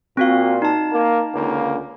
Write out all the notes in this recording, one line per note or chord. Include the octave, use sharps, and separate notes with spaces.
A#2 C4 F#4 F5
D#4 A5
A#3
C#2 D3 A#3